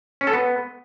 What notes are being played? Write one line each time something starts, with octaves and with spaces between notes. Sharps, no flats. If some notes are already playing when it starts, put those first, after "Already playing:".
C#4
A4
B3